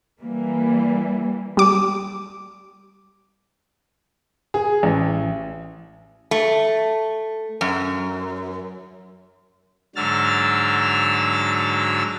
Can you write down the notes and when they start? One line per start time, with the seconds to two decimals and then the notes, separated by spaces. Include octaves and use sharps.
0.21 E3 G3 A#3
1.57 G3 D6
4.54 G#4
4.83 A1
6.31 A3
7.61 F#2
9.96 G#2 D3 F#3 E6 F6 A6